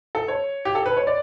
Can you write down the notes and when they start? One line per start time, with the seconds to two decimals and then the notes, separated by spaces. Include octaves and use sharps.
0.15 A4
0.28 C#5
0.65 G4
0.75 A4
0.86 B4
0.97 C#5
1.07 D5